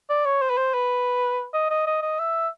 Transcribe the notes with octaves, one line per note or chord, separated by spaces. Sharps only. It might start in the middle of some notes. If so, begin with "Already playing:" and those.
D5
C#5
C5
B4
C5
B4
D#5
D#5
D#5
D#5
E5